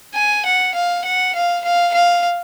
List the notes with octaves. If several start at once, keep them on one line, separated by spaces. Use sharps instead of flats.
G#5
F#5
F5
F#5
F5
F5
F5